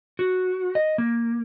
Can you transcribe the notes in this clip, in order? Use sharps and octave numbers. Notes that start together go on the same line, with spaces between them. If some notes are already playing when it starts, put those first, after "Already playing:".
F#4
D#5
A#3